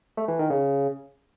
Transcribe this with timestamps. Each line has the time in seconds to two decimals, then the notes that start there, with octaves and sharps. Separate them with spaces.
0.17 A3
0.28 E3
0.39 D#3
0.50 C#3